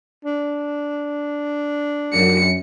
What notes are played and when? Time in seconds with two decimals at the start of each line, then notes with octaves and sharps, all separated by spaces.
0.25 D4
2.13 F#2 C#7